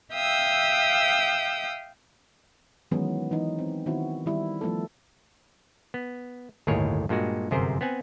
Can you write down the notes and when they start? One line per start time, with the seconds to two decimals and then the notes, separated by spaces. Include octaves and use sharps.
0.13 E5 F5 G5 D#6 E6
2.91 D#3 E3 F#3 G#3 B3 C#4
3.31 E3 D#4
3.59 C4
3.86 D#3 B3 C4 E4 F#4
4.26 D#3 G3 E4
4.61 F3 A3 B3 A4
5.94 B3
6.67 G1 D#2 A2 G#4 A#4 C#5
7.09 G2 A#2 G#3 F#4
7.51 G1 F#2 C3 G#4 A#4 C5
7.81 B3 C4 F#5 G#5